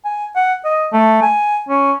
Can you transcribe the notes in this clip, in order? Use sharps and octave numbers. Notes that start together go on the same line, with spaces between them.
G#5
F#5
D#5
A3
G#5
C#4